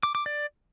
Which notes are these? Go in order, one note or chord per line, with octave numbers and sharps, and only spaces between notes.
D6
D6
D5